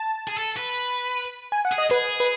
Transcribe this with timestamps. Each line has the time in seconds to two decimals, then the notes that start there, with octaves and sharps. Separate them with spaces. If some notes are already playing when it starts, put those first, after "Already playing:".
Already playing: A5
0.28 G#4
0.38 A4
0.57 B4
1.52 G#5
1.65 F#5
1.72 G#4
1.78 D#5
1.91 G#4 B4
2.20 B4